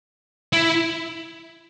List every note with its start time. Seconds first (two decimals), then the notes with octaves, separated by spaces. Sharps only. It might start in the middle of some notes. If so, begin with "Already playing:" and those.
0.53 E4